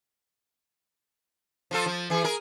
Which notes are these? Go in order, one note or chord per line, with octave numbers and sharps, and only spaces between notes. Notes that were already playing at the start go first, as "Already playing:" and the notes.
F3 F4 A4
F3
E3 G#4
G#4 A#4